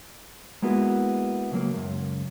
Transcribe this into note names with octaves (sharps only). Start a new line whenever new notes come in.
G#3 A#3 B3 E4 F#4
C#2 F#3 A#3
C#2 F#2